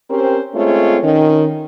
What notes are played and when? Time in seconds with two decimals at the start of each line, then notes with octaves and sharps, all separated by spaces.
0.10 C4 C#4 G4 A#4 C5
0.54 G#3 A3 C4 C#4 F4 C#5
1.03 D#3 C#4